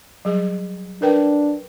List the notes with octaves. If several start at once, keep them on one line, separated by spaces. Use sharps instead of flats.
F#3 G3 G#4
D4 A#4 B4 G5